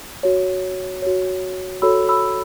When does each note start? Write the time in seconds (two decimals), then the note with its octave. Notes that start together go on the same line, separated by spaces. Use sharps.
0.23 F#4 C#5
1.02 F#4 C#5
1.82 F#4 A4 C#5 B5 E6
2.09 B5 E6